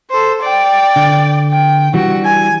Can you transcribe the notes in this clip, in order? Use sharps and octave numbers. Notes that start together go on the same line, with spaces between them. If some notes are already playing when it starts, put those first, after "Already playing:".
A4 C5
D5 G5
D3
G5
E3 G3 D4 F#4
G#5